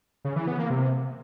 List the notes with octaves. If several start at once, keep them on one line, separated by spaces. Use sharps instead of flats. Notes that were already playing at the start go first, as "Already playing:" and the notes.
C#3
E3
B3
A#3
C3